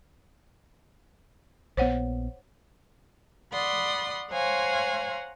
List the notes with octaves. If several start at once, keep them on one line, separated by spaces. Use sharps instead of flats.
A#1 B3 C5 C#5 F#5
D5 F#5 B5 C6 D#6
C5 C#5 F5 F#5 G#5 A#5